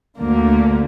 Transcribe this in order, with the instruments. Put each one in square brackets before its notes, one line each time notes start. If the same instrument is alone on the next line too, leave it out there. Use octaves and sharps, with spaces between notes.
[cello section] D2 D3 A3 [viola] A#3